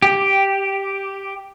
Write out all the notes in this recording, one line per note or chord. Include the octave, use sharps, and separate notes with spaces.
G4